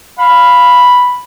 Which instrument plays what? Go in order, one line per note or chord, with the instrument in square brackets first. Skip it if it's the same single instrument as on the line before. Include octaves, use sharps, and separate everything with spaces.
[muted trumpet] F5 [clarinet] B5